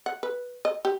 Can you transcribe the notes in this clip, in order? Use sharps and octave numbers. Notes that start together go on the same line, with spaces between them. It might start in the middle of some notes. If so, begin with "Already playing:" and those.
F#5
B4
D#5
G4